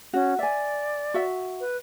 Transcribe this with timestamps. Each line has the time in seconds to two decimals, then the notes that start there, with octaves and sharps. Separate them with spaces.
0.13 C#4 F#4
0.39 D5 E5 G#5
1.14 F#4 E5
1.60 B4